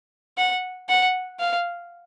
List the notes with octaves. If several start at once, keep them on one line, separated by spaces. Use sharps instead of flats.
F#5
F#5
F5